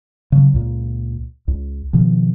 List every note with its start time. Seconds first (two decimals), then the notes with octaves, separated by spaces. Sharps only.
0.32 C#3 E3 F#3
0.54 C#2 A#2
1.48 C#2
1.93 B2 D#3 F3